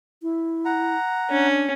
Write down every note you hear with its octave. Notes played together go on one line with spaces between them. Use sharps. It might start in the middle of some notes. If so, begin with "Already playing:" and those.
E4
F#5 A#5
C#4 D4